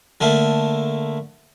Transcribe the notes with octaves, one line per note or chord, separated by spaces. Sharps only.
D3 A3 A#3